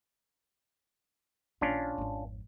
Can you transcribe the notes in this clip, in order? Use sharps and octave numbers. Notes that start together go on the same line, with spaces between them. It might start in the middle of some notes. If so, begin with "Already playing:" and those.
A#1 D#3 C#4 D4 F4
G#1 F2